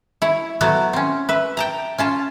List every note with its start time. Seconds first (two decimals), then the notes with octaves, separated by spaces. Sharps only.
0.22 E4 C#5
0.61 F#3 A3 B3 F#4 C#5
0.93 C4 C#4
1.29 B4 E5
1.57 G5 A5 A#5
1.98 C#4 F4 A5